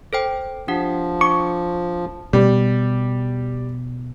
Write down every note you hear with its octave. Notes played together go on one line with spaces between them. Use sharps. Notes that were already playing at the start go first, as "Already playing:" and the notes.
A4 C5 G5
F3 D4 G4 F#5
D4 C#6 D6
B2 G3